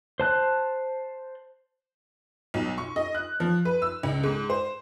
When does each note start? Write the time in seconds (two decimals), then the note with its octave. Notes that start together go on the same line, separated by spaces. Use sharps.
0.20 C5 A5 F#6
2.54 B1
2.78 C#6
2.96 D#5
3.14 F#6
3.40 F3
3.65 B4
3.82 E6
4.03 C#2
4.23 G#2
4.50 C5